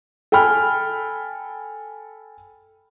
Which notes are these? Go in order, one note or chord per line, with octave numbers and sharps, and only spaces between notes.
A4 G5 G#5 B5 F6